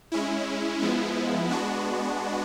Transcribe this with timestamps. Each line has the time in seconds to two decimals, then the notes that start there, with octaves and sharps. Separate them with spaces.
0.12 G#3 C#4 E4
0.81 F3 G#3 B3 E4
1.49 G#3 B3 D4 F#4